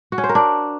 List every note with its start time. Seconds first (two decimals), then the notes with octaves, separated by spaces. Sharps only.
0.12 F#4
0.18 C#4
0.24 C5
0.29 A#4
0.35 D4